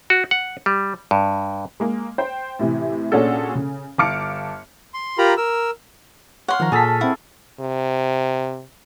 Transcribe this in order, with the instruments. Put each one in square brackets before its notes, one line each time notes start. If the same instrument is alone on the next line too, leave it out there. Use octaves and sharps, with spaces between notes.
[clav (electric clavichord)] F#4
F#5
G3
G2
[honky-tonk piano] G#3 A#3
C5 G5
A2 C3 E3
A#2 C#4 D4 F#4 G#4 A4
C#3
G1 F5 A5 D6 F6 C#7
[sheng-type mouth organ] C6
F4 G4 A#4 A#5 B5
A#4 E6
[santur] C#5 F5 [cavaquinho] F#5 C6
[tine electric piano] D#3 F3 [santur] F5 A#5
[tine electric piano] A#2 A5 B6 [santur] G#4 A4
[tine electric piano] C4 F#5 [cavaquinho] E4
[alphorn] C3